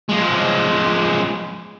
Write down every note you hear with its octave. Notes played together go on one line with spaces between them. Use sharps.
F3 G#3